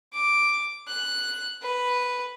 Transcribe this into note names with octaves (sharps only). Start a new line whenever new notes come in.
D6
F#6
B4